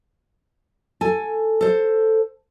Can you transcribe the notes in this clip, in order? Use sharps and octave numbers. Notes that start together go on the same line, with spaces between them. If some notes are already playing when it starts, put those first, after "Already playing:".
A4 G#5
A4 C5